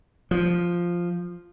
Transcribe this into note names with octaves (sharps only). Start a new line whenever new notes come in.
F3